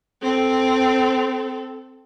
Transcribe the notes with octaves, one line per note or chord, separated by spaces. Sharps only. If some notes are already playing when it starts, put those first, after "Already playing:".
C4 A4